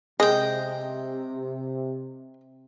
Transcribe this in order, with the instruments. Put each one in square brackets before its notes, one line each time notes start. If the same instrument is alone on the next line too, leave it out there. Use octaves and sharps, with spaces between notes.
[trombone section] C3 [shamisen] G#3 [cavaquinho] D#5 G5